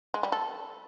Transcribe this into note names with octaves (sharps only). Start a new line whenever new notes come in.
G#3
G3
A4